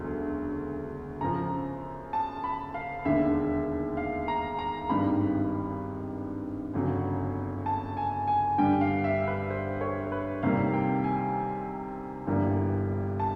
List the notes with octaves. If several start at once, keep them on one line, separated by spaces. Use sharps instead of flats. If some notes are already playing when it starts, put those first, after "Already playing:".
Already playing: E1 D2 C#3 F#3
F#2 C#3 F3 A#5
A5
B5
F5
E1 D#2 D3 E5
F5
A#5
A#5
G#1 G2 D#3 G3 B5
G1 F2 C#3 F#3
A5
G#5
G#5
G2 D3 G3 G5
F5
E5
B4
C5
C#5
B4
F2 C3 D#3 G3 A#3 F5
G5
G#5
G1 G2 E3 G3 A#3
A5